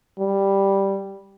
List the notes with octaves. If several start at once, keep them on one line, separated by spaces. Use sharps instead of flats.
G3